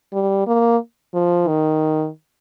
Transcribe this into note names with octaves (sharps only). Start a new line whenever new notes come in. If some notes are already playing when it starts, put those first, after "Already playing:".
G3
A#3
F3
D#3